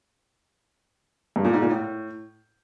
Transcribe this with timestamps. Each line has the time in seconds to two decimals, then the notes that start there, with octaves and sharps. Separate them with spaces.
1.36 G2
1.45 A#2
1.53 G#2
1.62 A#2
1.70 A2